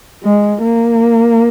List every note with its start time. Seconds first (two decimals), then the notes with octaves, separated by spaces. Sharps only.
0.24 G#3
0.61 A#3